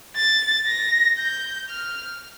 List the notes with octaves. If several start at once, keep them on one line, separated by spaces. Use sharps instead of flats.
A6
A#6
G6
F6